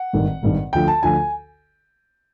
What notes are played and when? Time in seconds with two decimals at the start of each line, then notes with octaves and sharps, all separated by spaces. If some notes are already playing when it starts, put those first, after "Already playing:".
Already playing: F#5
0.13 G#1 G2 D#3
0.43 G#1 G2 D#3
0.73 D2 D3 F3 G5
0.88 A5
1.03 D2 D3 F3 G#5